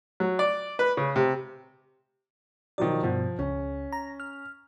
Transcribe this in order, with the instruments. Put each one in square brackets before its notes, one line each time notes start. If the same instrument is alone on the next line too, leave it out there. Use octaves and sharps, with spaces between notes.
[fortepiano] F#3
D5
B4
C#3
C3
[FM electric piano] B2 D5 [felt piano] D#3 F3 F#3
[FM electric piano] G2 B2 [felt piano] F3
[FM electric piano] C#2 [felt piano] C#4
[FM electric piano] A#5
F6